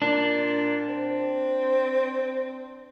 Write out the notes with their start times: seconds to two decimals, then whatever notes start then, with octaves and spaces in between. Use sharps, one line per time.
0.02 A#2 D4
0.89 C4